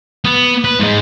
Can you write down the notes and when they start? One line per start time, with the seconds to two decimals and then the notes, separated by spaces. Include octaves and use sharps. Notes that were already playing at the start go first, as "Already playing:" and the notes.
0.25 B3
0.65 B4
0.80 G#2 G#3